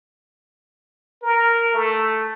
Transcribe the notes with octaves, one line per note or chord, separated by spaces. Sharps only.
A#4
A3